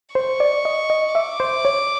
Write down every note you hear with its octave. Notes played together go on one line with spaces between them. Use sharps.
C5 C#6
D5
D#5
D#5
E5 D6
C5
C#5